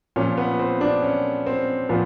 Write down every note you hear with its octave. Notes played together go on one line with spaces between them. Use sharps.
A#2 F3 C#4
B3
C4
D4
C#4
C4
A#2 F3 B3